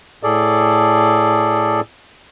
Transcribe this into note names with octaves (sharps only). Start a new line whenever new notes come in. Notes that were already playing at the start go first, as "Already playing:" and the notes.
A2 G#4 A4 D5